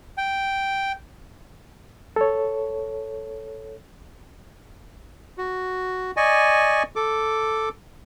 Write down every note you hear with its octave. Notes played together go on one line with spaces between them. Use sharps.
G5
A4 C#5
F#4
D5 D#5 G#5 C#6
A4 D6